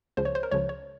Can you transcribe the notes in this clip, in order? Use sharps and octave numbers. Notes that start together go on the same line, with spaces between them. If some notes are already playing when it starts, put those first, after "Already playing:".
C#2 C#3 F3 C5
C#5
C5
A#4
C#2 C#3 F3 C#5
C#5